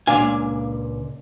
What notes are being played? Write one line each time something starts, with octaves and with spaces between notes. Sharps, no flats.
C#2 A#2 D4 F5 G#5